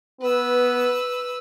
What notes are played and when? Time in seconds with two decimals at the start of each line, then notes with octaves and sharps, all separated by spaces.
0.21 B3 B4 E6